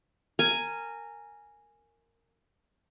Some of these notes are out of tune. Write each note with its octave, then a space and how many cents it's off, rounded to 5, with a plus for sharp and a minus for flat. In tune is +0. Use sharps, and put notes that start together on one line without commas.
A#4 -15 G#5 +0